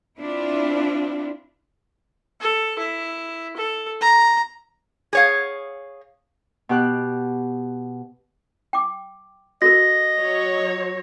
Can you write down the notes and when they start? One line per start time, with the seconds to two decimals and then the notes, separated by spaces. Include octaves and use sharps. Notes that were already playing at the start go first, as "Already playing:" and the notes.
0.19 C4 D4 E4 F4
2.41 A4
2.79 E4
3.57 A4
4.01 A#5
5.13 G#4 C#5 F5
6.69 B2 G4 F#6
8.73 G5 D6
9.62 F#4 A4 A#4 D#5 A#6
10.21 F#3 C#5